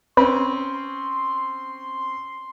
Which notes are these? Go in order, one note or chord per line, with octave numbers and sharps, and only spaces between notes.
C4 C#4 B4 C6